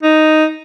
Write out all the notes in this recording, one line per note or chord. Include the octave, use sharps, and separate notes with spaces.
D#4